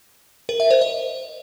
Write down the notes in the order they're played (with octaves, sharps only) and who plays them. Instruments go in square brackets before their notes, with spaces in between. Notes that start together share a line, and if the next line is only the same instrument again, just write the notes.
[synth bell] A#4
E5
C5
D#5